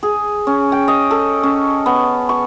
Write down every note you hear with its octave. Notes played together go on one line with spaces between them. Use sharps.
G#4
C#4
G5
D#5
A4
C#4
B3
C#6